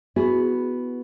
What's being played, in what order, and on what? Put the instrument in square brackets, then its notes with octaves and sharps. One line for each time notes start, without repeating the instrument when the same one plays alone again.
[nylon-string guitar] B3 E4 F#4 G#4